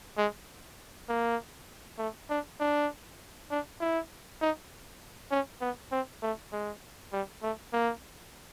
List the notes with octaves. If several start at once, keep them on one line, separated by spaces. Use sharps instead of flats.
G#3
A#3
A3
D4
D4
D4
E4
D#4
C#4
B3
C4
A3
G#3
G3
A3
A#3